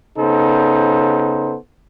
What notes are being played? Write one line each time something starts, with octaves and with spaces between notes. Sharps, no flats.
C#3 B3 D#4 A4 C5